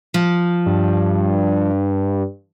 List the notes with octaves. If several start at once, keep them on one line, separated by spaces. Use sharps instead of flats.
F3
G2